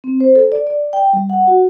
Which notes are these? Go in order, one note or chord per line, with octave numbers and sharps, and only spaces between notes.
C4
C5
A4
D5
D5
G5
G3
F#5
F#4